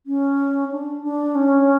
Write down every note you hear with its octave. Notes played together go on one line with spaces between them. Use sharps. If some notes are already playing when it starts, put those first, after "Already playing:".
C#4
D4
D4
C#4